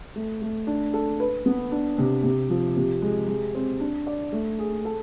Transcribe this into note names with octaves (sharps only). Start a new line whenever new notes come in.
A3
A3
D4
A4
B4
B3
D4
C3
C3
F3
C3
G#3
G#3
C4
D4
D5
A3
G#4
A4